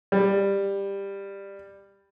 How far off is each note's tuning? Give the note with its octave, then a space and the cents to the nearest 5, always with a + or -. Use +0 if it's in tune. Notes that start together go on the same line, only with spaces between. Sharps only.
G3 +15